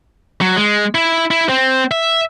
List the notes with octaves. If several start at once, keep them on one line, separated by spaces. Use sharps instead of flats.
F#3
G#3
E4
E4
C4
E5